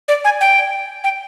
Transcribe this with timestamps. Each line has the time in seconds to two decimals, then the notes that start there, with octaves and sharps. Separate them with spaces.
0.08 D5
0.25 G#5
0.41 G5
1.04 G5